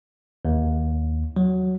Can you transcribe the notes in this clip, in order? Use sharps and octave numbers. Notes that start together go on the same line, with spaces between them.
D#2
F#3